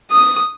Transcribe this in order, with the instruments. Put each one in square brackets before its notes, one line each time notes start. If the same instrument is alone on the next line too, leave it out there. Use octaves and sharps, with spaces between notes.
[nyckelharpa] D#6